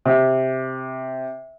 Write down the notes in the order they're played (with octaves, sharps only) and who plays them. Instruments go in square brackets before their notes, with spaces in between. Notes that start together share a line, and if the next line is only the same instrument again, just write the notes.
[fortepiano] C3